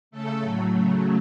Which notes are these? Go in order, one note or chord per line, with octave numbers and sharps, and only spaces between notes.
C#3 A3 A4
A2 F#3 A3
C#3 F#3 A3